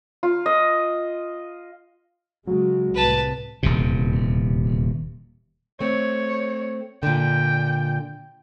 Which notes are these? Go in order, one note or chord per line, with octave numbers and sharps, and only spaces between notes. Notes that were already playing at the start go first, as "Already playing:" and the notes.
F4
D#5
C#3 F#3 G#3
C2 A2 B4 A5
D#1 E2 C3
A3 C4 C#5
A#2 D3 G5